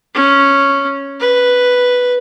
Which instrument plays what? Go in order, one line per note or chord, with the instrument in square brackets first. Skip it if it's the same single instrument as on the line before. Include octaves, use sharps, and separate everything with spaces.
[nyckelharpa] C#4
B4